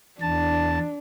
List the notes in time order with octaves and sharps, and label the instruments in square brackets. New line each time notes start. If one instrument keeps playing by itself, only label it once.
[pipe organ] E2 A5 [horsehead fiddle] D4